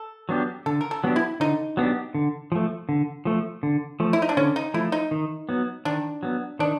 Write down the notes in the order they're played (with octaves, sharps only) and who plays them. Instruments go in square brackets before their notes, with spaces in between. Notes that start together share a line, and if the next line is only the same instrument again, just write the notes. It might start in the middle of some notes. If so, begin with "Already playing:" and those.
Already playing: [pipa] A4
[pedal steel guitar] F#3 B3 D4 G4
[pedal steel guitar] D3 [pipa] A4
[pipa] A#4
A4
[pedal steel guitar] F#3 B3 D4 G4
[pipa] E4
[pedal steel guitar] D3 [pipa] D#4
[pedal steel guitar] F#3 B3 D4 G4
D3
F3 A3
D3
F3 A3
D3
F3 A3
[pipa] E4
D#4
D4
[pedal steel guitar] D3 [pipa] C#4
[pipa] D#4
[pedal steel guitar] F3 A3 [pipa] E4
[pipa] D#4
[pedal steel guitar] D#3
F#3 B3
[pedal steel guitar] D#3 [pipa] D4
[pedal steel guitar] F#3 B3
[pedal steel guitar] D#3 [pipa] D4